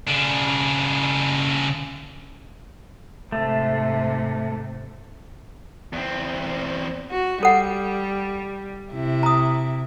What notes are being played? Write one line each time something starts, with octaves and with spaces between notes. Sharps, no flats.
C#3 D4
G#2 C3 A3
E2 C4
F#4
G3 A4 F#5
C3 E4
A#5 D#6